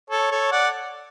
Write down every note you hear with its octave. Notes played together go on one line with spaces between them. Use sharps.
A4 C#5
A4 C#5
D5 F#5